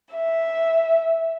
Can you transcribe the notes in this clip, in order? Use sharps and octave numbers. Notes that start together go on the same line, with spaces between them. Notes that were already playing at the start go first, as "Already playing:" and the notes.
E5